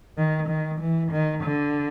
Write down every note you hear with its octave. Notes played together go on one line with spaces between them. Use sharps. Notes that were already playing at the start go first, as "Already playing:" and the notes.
D#3
D#3
E3
D#3
D3